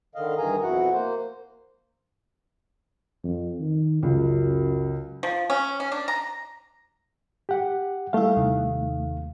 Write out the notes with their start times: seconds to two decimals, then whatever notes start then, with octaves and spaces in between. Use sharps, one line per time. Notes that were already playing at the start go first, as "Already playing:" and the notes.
0.15 D3 D#3 D#5 F5
0.38 G2 D#3 E3 G#4 G#5 A#5
0.62 F2 B2 E4 F#4 F#5
0.93 A#3 C5
3.24 F2
3.60 D#3
4.03 C#2 F#2
5.23 F3
5.50 C#4
5.80 C#4
5.92 D4
6.08 A#5
7.49 G4 F#5
8.13 G3 A3 E4 F5
8.36 D#2 C3